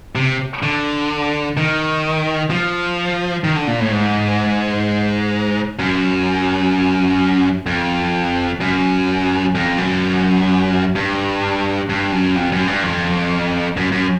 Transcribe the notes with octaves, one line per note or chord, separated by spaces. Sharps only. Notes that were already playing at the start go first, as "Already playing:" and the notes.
C3
D3
D#3
F3
D#3
D3
A#2
A2
G#2
F#2
F2
F#2
F2
F#2
G2
G2
F#2
F2
F#2
G2
F2
F#2
F#2